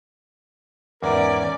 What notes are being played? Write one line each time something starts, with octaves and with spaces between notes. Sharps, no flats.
E2 G#2 C#4 A#4 D5